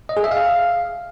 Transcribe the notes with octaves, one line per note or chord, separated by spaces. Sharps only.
D#5
G#4
E5
F5